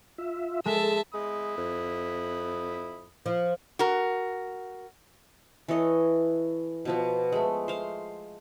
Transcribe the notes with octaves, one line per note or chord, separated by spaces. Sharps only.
F4 E5
G#3 A4 E5 A5
G#3 E4 B5 D#6
F2
F3
F#4 A#4
E3 A4 C#5 D#5
B2 F3 B3
G#3 A3
C5 F5